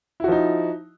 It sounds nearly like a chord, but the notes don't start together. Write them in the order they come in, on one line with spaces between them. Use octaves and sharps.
E4 F#4 F3 D#4